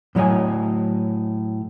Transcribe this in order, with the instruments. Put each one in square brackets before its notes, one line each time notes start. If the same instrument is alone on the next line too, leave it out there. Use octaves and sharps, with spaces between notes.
[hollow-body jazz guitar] A2 F#3 C#5 D#5 G#5